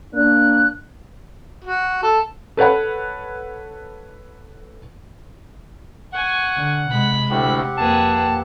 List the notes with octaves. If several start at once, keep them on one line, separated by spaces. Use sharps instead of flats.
A#3 D4 F#6
F#4
A4
A4 B4 C#5 F#5 B5
F#5 G#5 C#6
D3
C3 G#3 B5
D2 A2 C4 G4 F#5
F2 A#3 G#4 B4 A5